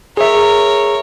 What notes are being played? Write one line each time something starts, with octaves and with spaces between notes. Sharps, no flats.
G#4 A#4 C#5 E5